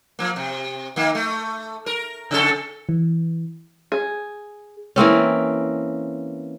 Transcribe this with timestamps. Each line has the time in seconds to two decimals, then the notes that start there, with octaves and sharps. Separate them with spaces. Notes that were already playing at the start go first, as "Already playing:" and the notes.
0.19 F3 A#3
0.36 C3
0.96 D#3 A#3
1.15 A3
1.86 A#4
2.31 C#3 C#4 A4
2.89 E3
3.92 G#4
4.96 E3 A#3 C4 C#4